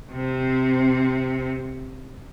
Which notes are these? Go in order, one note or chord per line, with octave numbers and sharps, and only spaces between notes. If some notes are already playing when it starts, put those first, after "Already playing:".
C3 C4